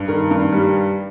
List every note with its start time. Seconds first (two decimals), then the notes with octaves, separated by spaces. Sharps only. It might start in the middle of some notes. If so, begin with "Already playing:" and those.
Already playing: G2
0.08 D#3 A#4
0.31 G2
0.52 G3